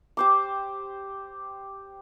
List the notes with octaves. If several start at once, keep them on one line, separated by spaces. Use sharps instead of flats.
G4 C5 D6